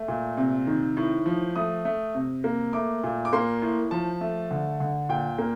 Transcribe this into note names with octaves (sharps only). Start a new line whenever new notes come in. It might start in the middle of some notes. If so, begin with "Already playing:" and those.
Already playing: A3
A#2
C3
D#3
A2
F3
A3 D#6
A3
C3
A#3
A3 D6
A#2
D6
A#3 C6
A2
F3 A5
A3
D3
D3
A#2 G5
A#3